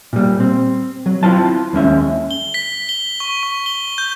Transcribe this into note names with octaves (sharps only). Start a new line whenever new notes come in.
A#2 G3
C4
F#3
C4 E4 F4 C5 F5 A5
D#2 G#3 C#4 E5
G7
B6
G7
C#6
C#6
G7
G6